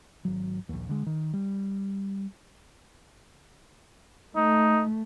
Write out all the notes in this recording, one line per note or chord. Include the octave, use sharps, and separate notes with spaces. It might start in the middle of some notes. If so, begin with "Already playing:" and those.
G#1 F#3
A#1 D#2
D3 G#3
D#3
G3
A3 D#4